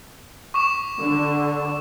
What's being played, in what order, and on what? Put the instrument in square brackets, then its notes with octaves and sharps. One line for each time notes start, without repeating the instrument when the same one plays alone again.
[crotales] C#6 D6 E7
[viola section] D3